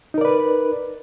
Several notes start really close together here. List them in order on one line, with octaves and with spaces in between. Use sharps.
D#4 A#4 D5 B4